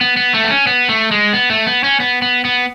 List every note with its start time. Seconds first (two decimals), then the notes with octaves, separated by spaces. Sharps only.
0.01 B3
0.17 B3
0.34 A3
0.44 B3
0.50 C#4
0.67 B3
0.89 A3
1.11 G#3
1.33 B3
1.50 A3
1.67 B3
1.84 C#4
2.00 B3
2.22 B3
2.45 B3